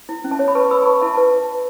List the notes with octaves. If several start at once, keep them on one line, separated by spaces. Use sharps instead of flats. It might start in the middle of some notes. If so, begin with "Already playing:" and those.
E4
C#4
E5 A5
C#5
B5
B4 A5 C#6
B4 B5 E6
B5
B4 A5 C#6
E4 E5 A5
B4 A5